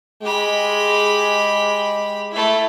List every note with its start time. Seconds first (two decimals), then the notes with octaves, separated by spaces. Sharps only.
0.22 G#3 G4 B5
2.32 A3 E4